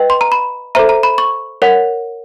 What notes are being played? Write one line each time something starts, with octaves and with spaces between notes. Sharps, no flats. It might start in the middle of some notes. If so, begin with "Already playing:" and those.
Already playing: B4 D#5 G5
C6
A#5
B5
A4 C5 E5 A#5
A#5
B5
C#6
A#4 C#5 F#5